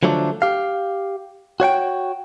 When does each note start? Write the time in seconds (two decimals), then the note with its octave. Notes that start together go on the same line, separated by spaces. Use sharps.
0.03 D3 F3 F#3 A3 C#4 D4
0.42 G4 F5
1.60 F#4 C#5 F#5 G5